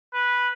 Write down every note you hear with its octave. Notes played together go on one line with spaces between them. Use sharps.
B4